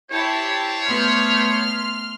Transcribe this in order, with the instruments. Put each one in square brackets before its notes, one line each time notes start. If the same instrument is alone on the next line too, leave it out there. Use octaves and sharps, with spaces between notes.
[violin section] E4 G4 A5 [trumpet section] C5 C#5
[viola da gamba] A3 B3 [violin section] C6 F6